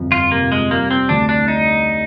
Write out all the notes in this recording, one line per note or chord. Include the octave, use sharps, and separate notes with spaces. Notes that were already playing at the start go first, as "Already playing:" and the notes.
Already playing: G1 F2 F3
F4
C3 A#3
G#3
G3 A#3
C4
D2 D4
D4
D4 D#4